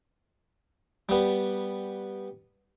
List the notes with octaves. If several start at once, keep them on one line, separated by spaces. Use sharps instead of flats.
G3 B3